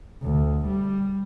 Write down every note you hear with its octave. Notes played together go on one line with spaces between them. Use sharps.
D2
G3